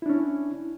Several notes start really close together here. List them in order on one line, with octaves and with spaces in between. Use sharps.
E4 D4 C#4